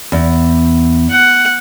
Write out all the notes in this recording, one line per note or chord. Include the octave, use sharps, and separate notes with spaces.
E2
F#5